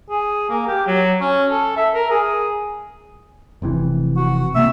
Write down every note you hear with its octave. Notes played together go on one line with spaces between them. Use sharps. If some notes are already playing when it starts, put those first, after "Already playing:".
G#4
A#3
G4
F#3
C#4
A4
E5
A#4
G#4
F1 C3 E3
F#4
C3 A#3 C4 E5